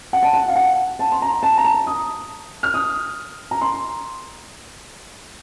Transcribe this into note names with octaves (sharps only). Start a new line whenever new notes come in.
F#5
A5
F#5
F5
F#5
A5
C6
A#5
A5
A#5
A5
D#6
F6
D#6
A#5
C6